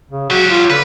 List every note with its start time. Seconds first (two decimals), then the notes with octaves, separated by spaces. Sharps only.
0.11 C#3
0.30 F#3 F#4 G4
0.49 F4
0.70 D3 B4